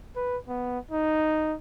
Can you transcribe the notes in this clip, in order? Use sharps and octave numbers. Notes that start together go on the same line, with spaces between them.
B4
B3
D#4